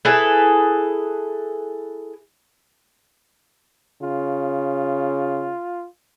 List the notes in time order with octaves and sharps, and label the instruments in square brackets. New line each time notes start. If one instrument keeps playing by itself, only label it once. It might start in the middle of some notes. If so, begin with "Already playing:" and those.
[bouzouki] E4 G#4 A4 B4
[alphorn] C#3 [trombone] F4